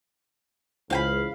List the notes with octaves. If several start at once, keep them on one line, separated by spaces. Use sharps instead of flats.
C#2 E3 C5 C#5 F5 G5 B5